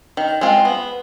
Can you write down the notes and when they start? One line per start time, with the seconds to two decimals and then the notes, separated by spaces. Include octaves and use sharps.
0.17 D#3
0.41 G#3 C4 F4
0.65 B3